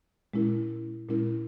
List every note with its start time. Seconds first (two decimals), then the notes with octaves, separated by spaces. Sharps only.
0.34 A#2 G#3 C#4 E4 A#4
1.08 A#2 G#3 C#4 E4 A#4